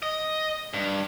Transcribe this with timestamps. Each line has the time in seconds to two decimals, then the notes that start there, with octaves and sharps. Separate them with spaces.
0.02 D#5
0.73 G2